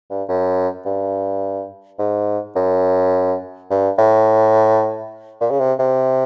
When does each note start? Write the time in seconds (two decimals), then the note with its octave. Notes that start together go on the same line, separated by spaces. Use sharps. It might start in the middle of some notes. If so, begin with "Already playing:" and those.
0.10 G2
0.28 F#2
0.85 G2
1.99 G#2
2.56 F#2
3.70 G2
3.99 A2
5.41 A#2
5.51 C#3
5.60 C3
5.79 C3